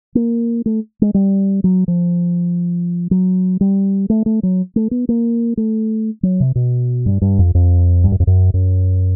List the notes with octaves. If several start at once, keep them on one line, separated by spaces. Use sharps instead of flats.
A#3
A3
G#3
G3
F#3
F3
F#3
G3
A3
A3
F#3
A3
B3
A#3
A3
F#3
C3
B2
G2
G2
F2
F2
G2
F#2
F2
F#2
F#2